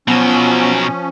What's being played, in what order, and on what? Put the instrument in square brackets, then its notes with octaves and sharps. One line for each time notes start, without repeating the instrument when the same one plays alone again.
[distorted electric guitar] B2 F#3 [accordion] F3 C#4 [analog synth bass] B3